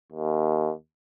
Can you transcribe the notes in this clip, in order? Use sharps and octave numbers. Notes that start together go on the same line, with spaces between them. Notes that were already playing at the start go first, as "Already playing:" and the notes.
D#2